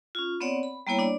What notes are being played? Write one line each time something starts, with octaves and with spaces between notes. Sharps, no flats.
C#4 F4
B3 C4 C#5 D5 F#5
B5
G3 A#3 B3 E4 C#5
D4 D5